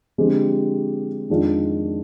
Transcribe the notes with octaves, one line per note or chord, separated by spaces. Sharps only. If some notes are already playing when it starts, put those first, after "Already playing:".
D3 F3 G#3 C4 G4
F2 D#3 G#3 D4 F4